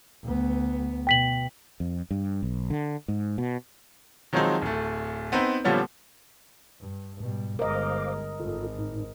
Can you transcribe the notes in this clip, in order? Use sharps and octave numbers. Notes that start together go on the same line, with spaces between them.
D2 B3
B2 G5 B6 F#7
F2
G2
B1
D3
G#2
B2
D#3 F3 F#3 G#3 C4 D#4
D1 A3
B3 C4 D#4 B4
A#2 D3 F3 G3 B3 C#4
G2
G#2 B2 G3
G1 G#3 A#4 C5 D#5 F5 D6
G#1 F4 A4
A2 D#4